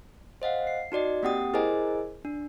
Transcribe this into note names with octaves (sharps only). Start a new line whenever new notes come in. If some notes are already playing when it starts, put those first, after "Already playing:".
C5 D#5 F5 F#5
C7
D#4 F#4 D5 D#5
A#3 C4 G4 F#5 G5 D#6
E4 G#4 A#4 C5 D#5 G#5
D4